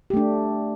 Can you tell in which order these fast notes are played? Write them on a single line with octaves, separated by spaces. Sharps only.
G4 A3 D4